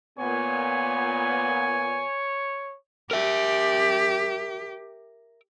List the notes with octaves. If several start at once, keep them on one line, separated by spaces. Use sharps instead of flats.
A#2 B3 C#5 G#5
G4 A#4 E5